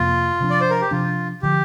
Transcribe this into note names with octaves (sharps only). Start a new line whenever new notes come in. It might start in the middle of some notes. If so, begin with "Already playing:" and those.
Already playing: F2 C3 A#3 F4
C3 F3 D4
D5
C5
A#4
G4
C3 F3 D4 F4
D3 F3 G4